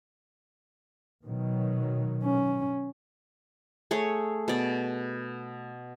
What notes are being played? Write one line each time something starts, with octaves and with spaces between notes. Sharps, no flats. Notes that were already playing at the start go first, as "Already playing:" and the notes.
B2 D#3 F#3
C#4
A3 G#4 C#5
B2 D5